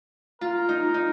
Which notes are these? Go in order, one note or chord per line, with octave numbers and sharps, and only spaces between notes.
F4 A#4
D#4
D#4